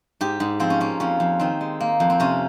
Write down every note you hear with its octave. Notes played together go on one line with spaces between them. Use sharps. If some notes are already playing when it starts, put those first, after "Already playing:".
G#2 G4
G#2
F3 C4
C#4
A#3 C#4
F2 C#4
F2
D#3 C4
G#3
A#3
F2
C4
C3 C#4